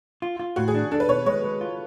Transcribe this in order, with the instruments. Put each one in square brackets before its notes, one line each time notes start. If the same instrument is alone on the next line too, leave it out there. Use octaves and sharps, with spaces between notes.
[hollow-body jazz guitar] F4
F4
[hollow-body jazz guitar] A2 [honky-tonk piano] F#4
[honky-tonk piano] G#4
[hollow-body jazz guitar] D4
[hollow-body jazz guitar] D4 [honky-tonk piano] A4
[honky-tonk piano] B4
[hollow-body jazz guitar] B2 [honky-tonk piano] C#5
[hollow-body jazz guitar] G#3 [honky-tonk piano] C#5
[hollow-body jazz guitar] G#3
F4